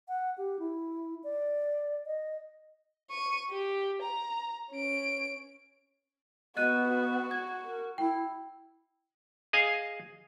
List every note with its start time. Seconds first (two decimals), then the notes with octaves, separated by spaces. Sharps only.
0.08 F#5
0.38 G4
0.59 E4
1.24 D5
2.06 D#5
3.10 C#6 D#7
3.50 G4
4.02 A#5
4.71 C#4 D7
6.57 B3 F#4 D#5 F#6 D#7
6.89 F#4
7.31 G#6
7.63 A#4
7.98 E4 G5
9.53 G#4 D#5 F5 G#5